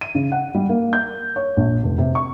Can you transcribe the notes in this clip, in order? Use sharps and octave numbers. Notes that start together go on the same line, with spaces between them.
D#7
C#3
F#5
G3
A#3
G6
C#5
A#1
F1
C3
C#6